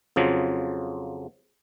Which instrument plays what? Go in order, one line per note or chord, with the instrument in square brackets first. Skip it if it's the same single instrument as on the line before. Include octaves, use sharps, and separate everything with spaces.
[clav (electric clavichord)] F2 C#3 F3 F#3